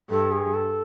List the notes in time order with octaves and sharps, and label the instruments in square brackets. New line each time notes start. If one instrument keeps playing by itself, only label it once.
[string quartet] G2 [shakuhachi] A4
[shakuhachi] G#4
A4